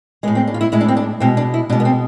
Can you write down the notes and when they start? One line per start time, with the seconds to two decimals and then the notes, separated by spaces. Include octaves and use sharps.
0.23 G#3 B3
0.28 A2
0.35 C4
0.48 D4
0.54 F4
0.61 E4
0.72 A2 G#3 E4
0.81 D4
0.88 C4
0.97 D4
1.20 B2 G#3 C4
1.37 D4
1.54 E4
1.69 B2 D4
1.72 G#3
1.80 B3
1.85 C4